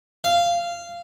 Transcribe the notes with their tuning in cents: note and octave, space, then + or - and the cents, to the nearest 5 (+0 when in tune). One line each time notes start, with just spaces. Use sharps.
F5 -15